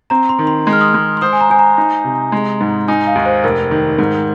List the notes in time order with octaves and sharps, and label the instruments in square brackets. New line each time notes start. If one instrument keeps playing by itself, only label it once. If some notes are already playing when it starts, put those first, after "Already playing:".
[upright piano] C4 [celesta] A#5
[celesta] C6
[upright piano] D#3
[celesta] C6
[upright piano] G#3
[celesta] F6
D#6
F6
[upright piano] G#3
[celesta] C6
[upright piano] C5 [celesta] D#6
[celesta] G#5
A#5
[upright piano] C5 [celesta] G#5
[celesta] A#5
[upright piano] D#4
C3
G#3
G#2
[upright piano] D#4 [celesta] G#5
[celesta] F5
[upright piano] D#2
[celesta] C5
[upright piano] F1 [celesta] A#4
[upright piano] D#3
G#2